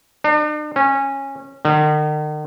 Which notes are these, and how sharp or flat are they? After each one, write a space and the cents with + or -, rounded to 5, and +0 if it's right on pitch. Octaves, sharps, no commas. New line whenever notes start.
D4 +45
C#4 -15
D#3 -45